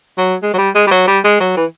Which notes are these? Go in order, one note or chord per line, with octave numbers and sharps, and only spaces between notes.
F#3
G#3
F#3
G3
G#3
G3
F#3
G3
G#3
F#3
E3